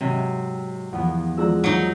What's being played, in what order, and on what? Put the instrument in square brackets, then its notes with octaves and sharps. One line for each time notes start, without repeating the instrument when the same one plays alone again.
[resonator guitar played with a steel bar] G#2 C3 [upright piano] F#3
[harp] E2 F3 B3 [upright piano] F#5
[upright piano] F3 G#3 D5 [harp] F#5 A#5 E6
[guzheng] F#3 D#4